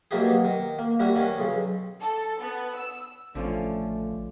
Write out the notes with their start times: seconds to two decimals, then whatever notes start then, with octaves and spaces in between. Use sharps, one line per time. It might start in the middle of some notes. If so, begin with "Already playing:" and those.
0.11 B2 F#3 A#3 E4 G4 G#4
0.45 D#3
0.79 A#3
1.00 G3 A#3 E4 F#4
1.16 D#3 C#4
1.38 B1 C#3
2.01 A4
2.40 B3
2.75 E6
3.35 A1 D3 F3 A3 C#4